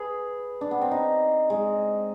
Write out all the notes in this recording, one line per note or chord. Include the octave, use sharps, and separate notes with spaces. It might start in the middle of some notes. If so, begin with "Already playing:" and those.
Already playing: G#4 B4
D4
B3
C4
D#4
G#3